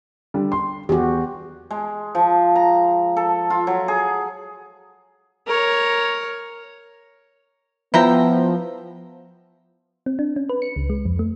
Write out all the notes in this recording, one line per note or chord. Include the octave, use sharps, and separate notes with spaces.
D3 G3
C6
E2 F#4 G4
G#3
F3
A#5
A4
F4
F#3
G#4
A#4 C#5
F3 B3 E4 G5 A#5
C4
D4
C#4
B4
C#7
C#2
G#3
F2
A3